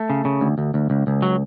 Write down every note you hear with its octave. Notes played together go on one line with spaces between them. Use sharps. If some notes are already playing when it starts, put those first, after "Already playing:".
Already playing: A3
C#3
C#3
D2
D2
D2
C#2
C#2
F#3